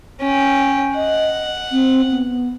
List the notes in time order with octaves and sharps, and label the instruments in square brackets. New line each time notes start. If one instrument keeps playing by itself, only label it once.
[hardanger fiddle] C#4 G5
[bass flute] D#5 [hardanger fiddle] F#5
[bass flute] C4
B3